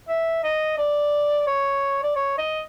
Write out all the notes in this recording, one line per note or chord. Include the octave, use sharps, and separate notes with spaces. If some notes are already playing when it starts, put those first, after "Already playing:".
E5
D#5
D5
C#5
D5
C#5
D#5